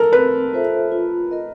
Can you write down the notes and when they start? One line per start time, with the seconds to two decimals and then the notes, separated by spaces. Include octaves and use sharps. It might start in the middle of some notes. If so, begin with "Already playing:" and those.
Already playing: A4 A#4
0.12 C4 B4
0.53 F4 A4 C5 E5
0.92 F4
1.31 A#4 D#5